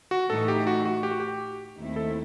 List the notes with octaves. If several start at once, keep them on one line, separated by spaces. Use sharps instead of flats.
F#4
A2 E3 A3 D#4 A4
G4
F#4
F#4
G4
F#4
G4
D#2 D#3 A3 C4 E4
A4